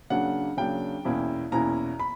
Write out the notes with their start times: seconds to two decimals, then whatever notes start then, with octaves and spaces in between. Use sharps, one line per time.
0.10 C#3 F#3 A#3 D4 F#5
0.57 C#3 F#3 A#3 D4 G5
1.05 E2 B2 A#3 C#4 E4
1.52 E2 B2 A#3 C#4 E4 A#5
1.99 B5